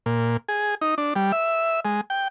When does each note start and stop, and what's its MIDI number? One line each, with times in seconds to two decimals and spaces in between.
0.06 0.37 46
0.49 0.75 68
0.81 0.95 63
0.98 1.14 62
1.16 1.32 55
1.32 1.80 76
1.85 2.01 56
2.10 2.28 79